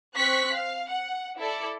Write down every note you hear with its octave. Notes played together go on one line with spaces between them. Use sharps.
C4 C#6 F#6 B6
F5
F#5
E4 A4 D5